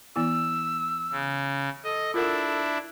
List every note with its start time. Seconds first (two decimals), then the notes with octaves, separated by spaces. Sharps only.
0.16 E3 B3 E4 E6
1.11 C#3
1.84 A4 D#5
2.14 D4 E4 F4 A#4 F#5